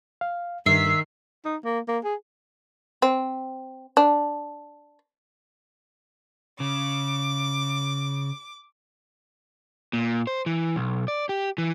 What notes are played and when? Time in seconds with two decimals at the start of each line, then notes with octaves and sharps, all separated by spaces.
0.21 F5
0.66 G2 D#3 E5 C7
1.45 D#4
1.64 A#3
1.88 A#3
2.04 G#4
3.02 C4
3.97 D4
6.60 C#3 D6
9.93 A#2
10.27 C5
10.46 E3
10.76 B1
11.08 D5
11.29 G4
11.58 E3